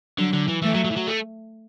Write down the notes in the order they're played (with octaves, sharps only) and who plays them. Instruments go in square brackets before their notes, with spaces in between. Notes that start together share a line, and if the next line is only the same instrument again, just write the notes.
[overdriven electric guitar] D3 [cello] F#3
[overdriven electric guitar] D3
E3
[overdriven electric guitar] E3 [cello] A3
[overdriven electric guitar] F#3
F#3
E3
F#3
A3